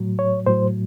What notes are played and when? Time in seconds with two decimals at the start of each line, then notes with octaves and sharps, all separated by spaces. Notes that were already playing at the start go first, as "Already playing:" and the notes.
Already playing: A2 F#3
0.19 C#5
0.46 A2 F#3 C5